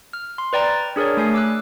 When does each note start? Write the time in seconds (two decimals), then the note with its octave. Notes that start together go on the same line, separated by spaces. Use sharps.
0.13 F6
0.38 C6
0.53 B4 D5 G5 A#5 A6
0.96 D4 G#4 A#4 C#5 D5
1.17 A3 G#5 C7
1.34 D6 E6 F#6